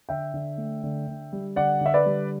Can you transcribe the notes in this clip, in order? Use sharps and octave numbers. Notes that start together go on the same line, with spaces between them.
D3 E5 G5
D3
A3
D3
D3
G3
D3 D5 F#5
D3 E5
B4 D5
G3